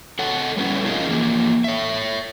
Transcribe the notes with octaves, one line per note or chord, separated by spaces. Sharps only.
A4 C#5 F#5
G3 A3 B3 C#4 E4
C#4 D#4 F4 G#4 A#4 D#5
E3 F3 A#3
C#5 E5